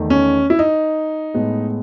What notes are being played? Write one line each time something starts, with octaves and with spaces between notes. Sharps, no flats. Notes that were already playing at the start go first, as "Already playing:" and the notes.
Already playing: E2 D#3 A3
C#4
E4
D#4
A2 G#3 B3